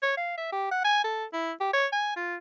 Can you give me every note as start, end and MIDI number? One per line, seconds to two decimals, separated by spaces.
0.03 0.12 73
0.17 0.37 77
0.37 0.50 76
0.52 0.71 67
0.71 0.81 78
0.84 1.02 80
1.04 1.25 69
1.33 1.53 64
1.60 1.68 67
1.73 1.87 73
1.93 2.15 80
2.16 2.36 65